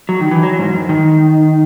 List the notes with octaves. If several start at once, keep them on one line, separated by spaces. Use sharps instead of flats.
F#3
D#3
E3
F#3
G#2
F#2
D#3